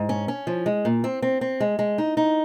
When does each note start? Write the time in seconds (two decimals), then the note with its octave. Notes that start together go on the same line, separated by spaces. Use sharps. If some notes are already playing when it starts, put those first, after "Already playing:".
Already playing: G#2
0.09 C#4
0.28 C#4
0.47 F3
0.66 G#3
0.85 A#2
1.04 C4
1.22 C4
1.41 C4
1.60 G#3
1.79 G#3
1.98 D#4
2.17 D#4